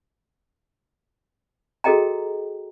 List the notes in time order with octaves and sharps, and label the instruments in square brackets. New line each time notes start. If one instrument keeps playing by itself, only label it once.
[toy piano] F#4 G#4 A4 D#5 G5 A#5